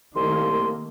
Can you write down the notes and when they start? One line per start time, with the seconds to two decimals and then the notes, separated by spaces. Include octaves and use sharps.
0.16 C2 D#3 A3 A#3 C6